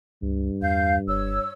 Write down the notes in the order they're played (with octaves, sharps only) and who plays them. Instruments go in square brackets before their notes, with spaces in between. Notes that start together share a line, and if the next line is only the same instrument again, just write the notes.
[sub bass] C#2 [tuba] G2
[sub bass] E2 [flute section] F5 G6
[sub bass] F#1 [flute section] C#5 E6